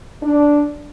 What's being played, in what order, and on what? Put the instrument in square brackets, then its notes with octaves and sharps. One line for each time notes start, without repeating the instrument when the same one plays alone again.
[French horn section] D4